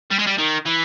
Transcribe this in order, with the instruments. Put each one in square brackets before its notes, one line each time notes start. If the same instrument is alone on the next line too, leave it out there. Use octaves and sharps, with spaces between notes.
[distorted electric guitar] G3
G#3
G3
D#3
E3